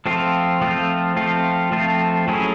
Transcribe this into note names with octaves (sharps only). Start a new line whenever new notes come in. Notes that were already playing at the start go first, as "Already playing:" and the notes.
F3 A3 C4 F4
F3 A3 C4 F4
F3 A3 C4 F4
F3 A3 C4 F4
F#3 A3 C#4 E4 G#4